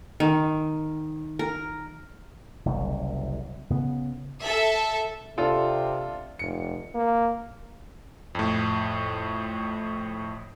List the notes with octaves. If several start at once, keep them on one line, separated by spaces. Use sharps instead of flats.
D#3
A#4
F#1 C2 F#2
C#3 B3
A4 E5
C3 D4 F4 A4
F1 C#7
A#3
F2 A2